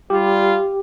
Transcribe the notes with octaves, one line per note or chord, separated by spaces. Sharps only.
G3 F4 G4